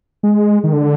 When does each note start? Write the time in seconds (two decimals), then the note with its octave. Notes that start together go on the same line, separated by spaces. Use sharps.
0.23 G#3
0.64 D#3
0.73 D3